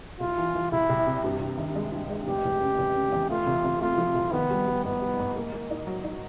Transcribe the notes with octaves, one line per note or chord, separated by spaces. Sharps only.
C2 F4
E3
E3
C2 E4
C2
C3
G2
G2
D#3
G#3
G2
G#3
F1 G4
F1
C#3
F1
C#3
E2
A3 F4
C3
C3
A3 F4
F3
C2
D#3 B3
G3
G3
G#2 B3
G3
G#2
A#3
A#3
D#4
F#3
D#4